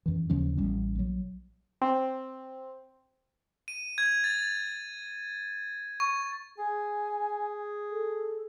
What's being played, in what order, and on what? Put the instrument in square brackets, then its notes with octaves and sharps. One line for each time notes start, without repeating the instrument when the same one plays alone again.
[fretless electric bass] F#2 E3
D#2 C#3 F3 C#4
A1 G3 C#4
A#1 F#3
[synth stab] C4
[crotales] D#7
G#6
A6
C#6
[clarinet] G#4 [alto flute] G#5
[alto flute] A4